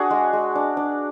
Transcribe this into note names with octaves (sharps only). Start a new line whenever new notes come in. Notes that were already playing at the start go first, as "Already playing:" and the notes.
Already playing: D4 F#4 G#4
G#3
G#3
D4
D4